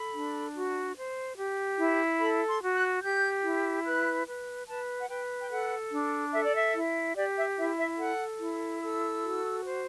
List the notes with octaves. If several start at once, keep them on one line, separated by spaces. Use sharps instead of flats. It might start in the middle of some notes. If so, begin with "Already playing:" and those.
Already playing: A4 B5
D4
F#4
C5
G4
E4
A4 B5
C6
F#4
F#6
G4 G6
E4
B4 F#6
B4
B4 A5
F#5
B4 G5
G5
A4 F#5
D4
A4 E5
D5
E5
E4
G4 D5
E5
E4 E5
E5
A4 F#5
E4
A4 E6
F#4
C5